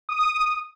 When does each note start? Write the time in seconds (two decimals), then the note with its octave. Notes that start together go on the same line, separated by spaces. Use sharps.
0.09 D#6